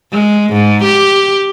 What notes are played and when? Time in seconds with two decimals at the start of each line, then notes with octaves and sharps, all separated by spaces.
0.12 G#3
0.53 G#2
0.84 G4